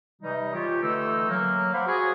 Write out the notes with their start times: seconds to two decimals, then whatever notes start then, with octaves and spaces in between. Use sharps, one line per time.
0.22 C3 E3 G3 D#4
0.54 F4 G4 C#5
0.82 D3 E3 A3 D#4 E6
1.29 F#3 A#3
1.73 C5 F5 F#5 B5 C6 D6
1.87 F#4 G#4